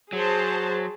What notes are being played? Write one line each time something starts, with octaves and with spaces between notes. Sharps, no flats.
F#3 G#4 C5 A5